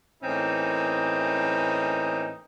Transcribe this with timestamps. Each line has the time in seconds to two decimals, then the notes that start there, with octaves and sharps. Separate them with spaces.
0.23 A2 E3 A#3 C4 C#4 D#4